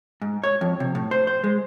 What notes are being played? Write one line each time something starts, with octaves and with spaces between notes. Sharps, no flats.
G#2
C#5
F2
C3
A2
C5
C5
G#3